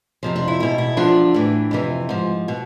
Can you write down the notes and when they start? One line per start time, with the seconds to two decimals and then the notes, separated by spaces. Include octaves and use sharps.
0.23 F2 C3 F3
0.36 D4
0.48 E4
0.60 E2 B2 E4
0.78 E4
0.97 E2 D3 F3 D4
1.34 A2 E3
1.71 F2 C3 E3
2.09 G#2 F3
2.48 B2